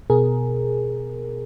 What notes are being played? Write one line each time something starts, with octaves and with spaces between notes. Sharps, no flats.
B2 G#4 A#4